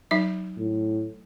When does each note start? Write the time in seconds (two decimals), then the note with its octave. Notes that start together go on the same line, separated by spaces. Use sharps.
0.11 F#3 D#4 E5
0.58 A2